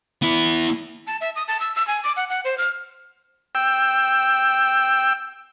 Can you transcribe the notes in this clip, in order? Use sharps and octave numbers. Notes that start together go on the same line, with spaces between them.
B3 E4
A5
E5
D#6
A5
E6
E6
G#5
D6
F#5
F#5
C5
F6
G5 E6